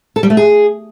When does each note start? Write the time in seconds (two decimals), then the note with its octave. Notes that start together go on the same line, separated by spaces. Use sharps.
0.16 A4
0.23 G3
0.30 A3
0.37 G#4